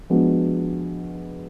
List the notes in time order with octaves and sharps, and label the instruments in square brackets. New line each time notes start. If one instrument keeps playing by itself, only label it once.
[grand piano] F3 G#3 B3 D4 F#4